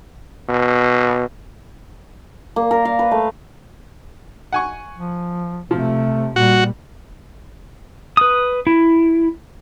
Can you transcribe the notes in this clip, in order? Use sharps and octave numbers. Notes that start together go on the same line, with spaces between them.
B2
A#3
A#4
F5
B4
A3
F#5 G#5 C#6
F3
C3 F3 A3
A#2 G3 F#4
B4 D#6
E4